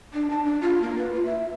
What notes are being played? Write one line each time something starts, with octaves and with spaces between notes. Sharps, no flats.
D4
A5
D4
F4
A#3
B4
F4
E5